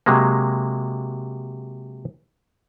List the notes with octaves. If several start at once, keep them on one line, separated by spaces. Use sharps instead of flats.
C3 F#3 G#3 A#3